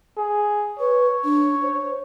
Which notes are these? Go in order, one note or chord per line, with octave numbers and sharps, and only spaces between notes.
G#4
B4 C#5
D4
C5